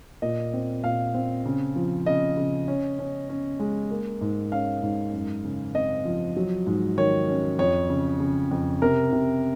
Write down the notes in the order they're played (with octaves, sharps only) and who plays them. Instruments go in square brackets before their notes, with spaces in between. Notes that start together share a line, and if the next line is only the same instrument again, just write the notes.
[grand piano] A#2 D#5
C4
A#2 F5
C4
C#3
F3
C#3 D#5
C#3
C#4
C#4
C#4
G#3
A#3
G#2
C#4 F5
G#2
F#2
C#3
C4 D#5
F3
F#3
G#2
D#3 C#5
C#4
F2 C#5
C#3
C#3
F2
C3 A#4
C3